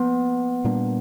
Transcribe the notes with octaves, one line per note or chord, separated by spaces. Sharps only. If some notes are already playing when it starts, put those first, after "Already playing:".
Already playing: F3 A#3 B3
A#2 G3 A#3 D4